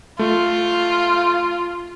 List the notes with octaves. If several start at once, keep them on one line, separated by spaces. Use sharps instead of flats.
A3 F4